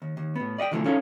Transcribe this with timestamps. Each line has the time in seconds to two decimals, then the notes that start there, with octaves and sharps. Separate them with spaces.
0.02 D#2
0.17 D#2
0.36 A2 B3
0.58 D5 D#5 F#5 G5
0.71 B2 D3 E3 F3 A3
0.85 C#4 D#4 A4 A#4 C#5 F5